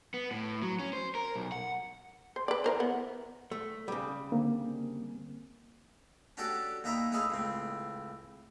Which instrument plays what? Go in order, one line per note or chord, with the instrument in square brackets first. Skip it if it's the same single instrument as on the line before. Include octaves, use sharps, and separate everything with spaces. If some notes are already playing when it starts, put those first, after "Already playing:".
[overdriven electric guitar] B3
A2
F#3
C#4
C5
A#4
B1
F#5
[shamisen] C5
B4 D5
E3 A#4 C5
B3
[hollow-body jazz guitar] A3
C#3 G3
[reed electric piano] D3 A#3 C4
[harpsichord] C#4 D4 F#4 G4 A4 D5
D#2 D#4 E5 G5 A#5 B5
A3 C#4 D#4 E4 G#4 F5
C#2 A2 C4